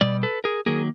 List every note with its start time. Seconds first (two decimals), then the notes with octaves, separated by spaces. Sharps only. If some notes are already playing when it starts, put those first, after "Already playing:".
0.01 B2 G3 D5
0.23 A4 B4
0.44 G#4 A#4
0.66 D#3 F#3 A#3 G#4 A#4